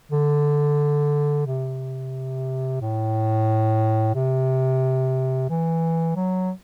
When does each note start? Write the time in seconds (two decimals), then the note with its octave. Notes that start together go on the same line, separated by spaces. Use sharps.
0.12 D3
1.46 C3
2.81 A2
4.15 C3
5.49 E3
6.16 F#3